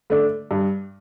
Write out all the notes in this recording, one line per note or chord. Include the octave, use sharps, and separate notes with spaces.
D3 A3 D4
G2